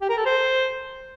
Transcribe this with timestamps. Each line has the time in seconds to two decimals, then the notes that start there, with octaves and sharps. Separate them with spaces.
0.01 G4
0.09 A#4
0.17 A4
0.25 C5